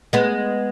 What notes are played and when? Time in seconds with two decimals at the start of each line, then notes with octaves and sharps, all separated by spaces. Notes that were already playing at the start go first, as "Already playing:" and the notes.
0.13 G#3 B3